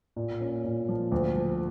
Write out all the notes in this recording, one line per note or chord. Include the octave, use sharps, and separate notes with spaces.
A#2
C#4
A#2
F3
D2
F3